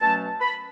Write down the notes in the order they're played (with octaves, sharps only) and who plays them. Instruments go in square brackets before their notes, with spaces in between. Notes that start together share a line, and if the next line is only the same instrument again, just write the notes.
[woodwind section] B2 F#3 A3 C#4 A5
B5